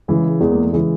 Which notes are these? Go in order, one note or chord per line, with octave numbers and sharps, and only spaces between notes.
C#3 E3 G#3
E2 G#3
A#3
A3
C#3 E3 G#3